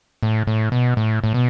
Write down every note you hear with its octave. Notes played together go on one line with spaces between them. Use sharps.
A2
A2
B2
A2
A2
B2